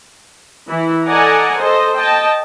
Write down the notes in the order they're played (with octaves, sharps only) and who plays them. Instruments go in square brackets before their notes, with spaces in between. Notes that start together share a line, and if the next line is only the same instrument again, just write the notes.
[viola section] E3 E4
A4 D5 D#5 F#5 G#5 A#5
A4 C5 D#5
D#5 G5 A5